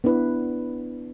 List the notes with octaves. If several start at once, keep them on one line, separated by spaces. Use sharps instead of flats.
B3 D4 E4 B4